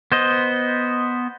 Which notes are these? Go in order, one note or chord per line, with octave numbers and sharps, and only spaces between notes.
B3 C5 D#5